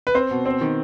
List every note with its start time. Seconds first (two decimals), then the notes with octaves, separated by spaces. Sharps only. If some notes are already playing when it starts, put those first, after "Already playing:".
0.07 B4
0.15 C4 C5
0.31 B2
0.46 C4
0.61 D#3